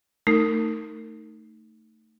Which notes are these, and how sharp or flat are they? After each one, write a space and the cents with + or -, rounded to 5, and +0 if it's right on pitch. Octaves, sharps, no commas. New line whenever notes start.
A3 +15 D#4 +0 A#4 -30